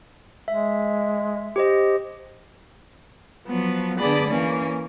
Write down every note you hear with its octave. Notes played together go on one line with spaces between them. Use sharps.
G#3 E5
G4 C5 D#5
F3 F#3 B3
D3 B3 D4 G#4 D5 B5
E3 A#3 C#4